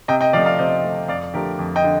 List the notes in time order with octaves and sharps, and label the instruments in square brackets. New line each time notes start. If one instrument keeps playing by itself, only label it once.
[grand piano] C3 D#5 G5
D#5 G5
F3 D5 F5
A3
D5 F5
C3 C5 D#5
F3 A3
F2 D5 F5
D3 F3 A3 G4 A#4
F2
D#5 G5
D3